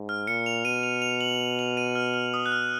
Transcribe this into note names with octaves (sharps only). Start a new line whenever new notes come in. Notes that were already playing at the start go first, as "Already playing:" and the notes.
Already playing: G#2
F6
A#2 C#7
F7
B2 D#7
F7
F7
F#7
F7
D#7
F6
F6
D#6
F#6
F6